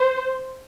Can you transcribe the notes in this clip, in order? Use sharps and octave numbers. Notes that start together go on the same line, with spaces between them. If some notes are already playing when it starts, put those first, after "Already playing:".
Already playing: C5